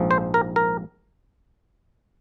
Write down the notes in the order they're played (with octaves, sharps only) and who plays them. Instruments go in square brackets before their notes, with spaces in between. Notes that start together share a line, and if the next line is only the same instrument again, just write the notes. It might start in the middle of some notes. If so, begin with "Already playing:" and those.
Already playing: [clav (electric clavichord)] A#1 G#2 F3
C5
A#4
A#4